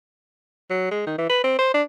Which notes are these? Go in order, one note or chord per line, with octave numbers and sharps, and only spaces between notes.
F#3
G#3
D#3
E3
B4
C4
C5
D4